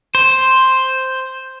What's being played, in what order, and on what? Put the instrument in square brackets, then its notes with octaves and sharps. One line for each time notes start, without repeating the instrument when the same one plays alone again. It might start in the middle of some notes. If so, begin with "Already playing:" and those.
[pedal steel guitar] C5